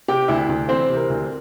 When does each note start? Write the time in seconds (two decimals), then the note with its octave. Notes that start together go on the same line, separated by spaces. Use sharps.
0.08 C3 G4 G5
0.28 D2 E4 E5
0.49 D2
0.69 E3 C4 C5
0.89 C3
0.97 A#4
1.10 D2